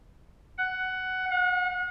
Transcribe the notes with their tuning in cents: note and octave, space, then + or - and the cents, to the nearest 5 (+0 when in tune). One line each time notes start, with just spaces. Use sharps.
F#5 +10
F#5 -40